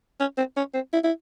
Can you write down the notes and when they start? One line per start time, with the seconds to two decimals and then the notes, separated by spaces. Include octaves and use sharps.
0.20 C#4
0.37 C4
0.57 C#4
0.74 C4
0.93 E4
1.04 E4